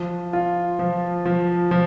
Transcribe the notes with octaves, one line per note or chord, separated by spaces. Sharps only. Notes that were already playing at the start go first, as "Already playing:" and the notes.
Already playing: F3
F4
F3
F3
F3